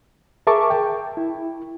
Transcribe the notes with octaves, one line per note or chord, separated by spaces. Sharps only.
G#4 A#4 E5 A5 C#6 D6
G5
E4